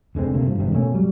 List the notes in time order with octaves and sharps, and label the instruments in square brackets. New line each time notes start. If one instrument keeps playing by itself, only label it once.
[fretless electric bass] F1 D3 G#3 C4
D2 C3 A3 A#3
G2 F3
G#1 E2 G2 C3
B2 A3 A#3 C#4
F#3 G3